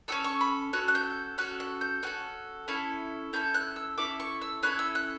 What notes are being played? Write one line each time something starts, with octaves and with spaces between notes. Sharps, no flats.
C#4 F#4 A4 E6
C#6
B5
C#4 F#4 A4 F#6
F#6
G6
C#4 F#4 A4 F#6
F#6
G6
C#4 F#4 A4 F#6
C#4 E4 A4
C#4 E4 A4 G6
F#6
E6
C#4 E4 A4 D6
C#6
E6
C#4 E4 A4 F#6
E6
F#6